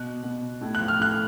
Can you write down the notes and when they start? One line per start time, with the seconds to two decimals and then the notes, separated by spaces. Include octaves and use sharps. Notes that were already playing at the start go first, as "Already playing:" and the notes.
Already playing: B2 F#6
0.23 B2
0.61 A2
0.75 F#6
0.80 F3
0.88 F6
0.99 A2 F#6